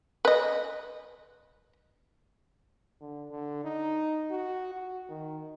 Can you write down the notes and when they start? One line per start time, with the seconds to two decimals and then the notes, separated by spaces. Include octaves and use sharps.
0.25 B4 D#5
3.01 D3
3.31 D3
3.65 D#4
4.31 F#4
4.74 F#4
5.09 D#3